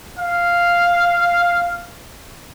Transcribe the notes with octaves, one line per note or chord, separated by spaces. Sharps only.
F5